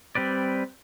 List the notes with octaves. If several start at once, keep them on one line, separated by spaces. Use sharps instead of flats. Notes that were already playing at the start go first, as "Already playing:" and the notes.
G3 C4 B4 D5